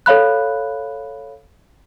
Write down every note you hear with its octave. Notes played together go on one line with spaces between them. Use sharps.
A4 C#5 F5 B5 F#6